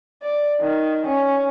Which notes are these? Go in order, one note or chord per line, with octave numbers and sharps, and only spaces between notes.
D5
D#3
C#4